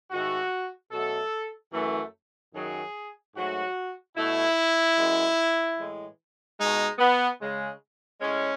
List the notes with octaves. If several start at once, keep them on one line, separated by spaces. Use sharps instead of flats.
G#2 D#3 A3 F#4
B2 F#3 A3 A4
F#2 E3 A3
F#2 D#3 F#3 G#4
G#2 F#3 A3 F#4
B2 A3 E4
F#2 E3 G#3
A2 E3 G#3
B2 G#3 D#4
B3
C#3 G#3
A2 G#3 C#4